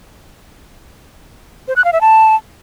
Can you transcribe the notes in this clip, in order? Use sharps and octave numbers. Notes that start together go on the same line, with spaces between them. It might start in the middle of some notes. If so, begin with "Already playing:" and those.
C5
F#6
F5
E5
A5